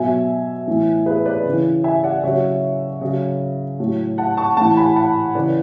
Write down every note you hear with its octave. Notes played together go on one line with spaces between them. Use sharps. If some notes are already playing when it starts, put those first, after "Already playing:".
Already playing: B2 F#3 E5 G#5
A2 E3
G#4 B4
B4 D5
C#3 E3
E5 G#5
D5 F#5
C#3 F#3 C#5 E5
C#3 F#3
A2 F#3
F#5 A5
A5 C#6
A2 E3 F#5 A5
G#5 B5
F#5 A5
C#3 E3 B4 D5